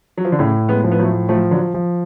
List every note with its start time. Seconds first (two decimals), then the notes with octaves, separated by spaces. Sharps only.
0.17 F#3
0.25 F3
0.32 D3
0.39 A2 C#3
0.69 G#3 B3
0.84 F3
0.92 B3
0.99 F#3 A3
1.29 F3 F#3 A3
1.51 D3 F#3
1.74 F3